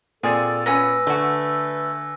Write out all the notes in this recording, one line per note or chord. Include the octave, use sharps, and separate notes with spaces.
A#2 C4 G#4 A4 D5 A6
F#3 B3 C#4 B4 G#5 E6 A#6
D3 A3 F#4